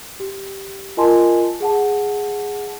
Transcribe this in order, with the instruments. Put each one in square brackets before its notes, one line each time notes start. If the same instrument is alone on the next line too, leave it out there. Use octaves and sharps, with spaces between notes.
[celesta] G4
F4 A#4 D#5 G#5 A5 C6
G#4 F#5 A5